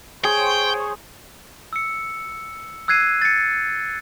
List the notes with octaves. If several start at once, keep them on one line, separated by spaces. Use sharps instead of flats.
G#4 C5 C#5 G5
E6 C#7
E6 F#6 G#6 C7 D#7
A6 C#7